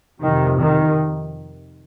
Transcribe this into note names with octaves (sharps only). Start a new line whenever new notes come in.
F2 C3 D#3
D#3